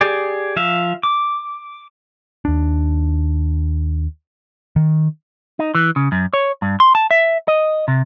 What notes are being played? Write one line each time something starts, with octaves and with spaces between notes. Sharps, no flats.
G4 G#4 D5
F3 E5 F5
D6
D#2 D4
D#3
D#4
E3
C#3
F#2
C#5
G2
C6
A5
E5
D#5
C3